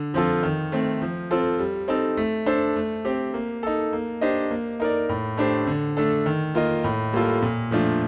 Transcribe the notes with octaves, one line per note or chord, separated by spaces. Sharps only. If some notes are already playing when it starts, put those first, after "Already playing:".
Already playing: D3
F3 C4 F4 A4
D#3
A3 C4
F3
C4 F4 A4
G3
C4 D#4 A4
A3
D4 A4 C5
A3
C4 G4
A#3
D#4 A4
A#3
D4 G4 C5 D#5
A#3
D#4 A#4 D5
A2
A3 D4 G4 C5
D3
A3 D4 A4
D#3
A#3 F4 A#4 D#5
A2
G3 A#3 F4 A4
A#2
F3 A3 D4 F4